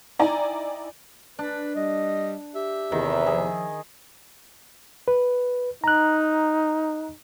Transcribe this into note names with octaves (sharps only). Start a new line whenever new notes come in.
D#4 E4 D5 G5 G#5 A#5
D4 B4
G3 D#5
G4 E5
E2 C3 D#3
F3 G#4
B4
D#4 A#5 F#6